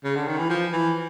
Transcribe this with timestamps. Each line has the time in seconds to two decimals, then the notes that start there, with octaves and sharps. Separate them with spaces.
0.04 C#3
0.16 D3
0.27 D#3
0.39 E3
0.49 F3
0.73 E3